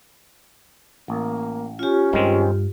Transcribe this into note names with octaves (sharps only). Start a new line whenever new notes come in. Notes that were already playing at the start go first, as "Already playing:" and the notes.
A1 A#3
C#4 F4 G4
G2 D#3 G#3 C4